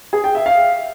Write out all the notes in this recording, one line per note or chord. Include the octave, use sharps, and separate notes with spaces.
G#4
G5
E5
F5